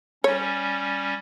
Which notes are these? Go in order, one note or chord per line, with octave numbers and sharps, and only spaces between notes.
G3 C#4 C#5